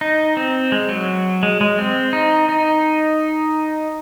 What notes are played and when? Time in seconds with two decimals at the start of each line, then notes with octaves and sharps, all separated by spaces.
0.01 D#4
0.37 C4
0.72 G#3
0.89 F#3
1.43 G#3
1.61 G#3
1.79 C4
2.13 D#4
2.49 D#4